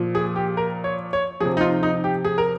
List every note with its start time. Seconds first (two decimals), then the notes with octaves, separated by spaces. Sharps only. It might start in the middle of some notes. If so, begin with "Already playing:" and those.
Already playing: A#2 F3
0.15 G#4
0.36 G4
0.57 A#4
0.84 C#5
1.13 C#5
1.40 C3 F3 G#4
1.57 D#4
1.61 F4
1.83 D#4
2.04 G4
2.25 G#4
2.38 A#4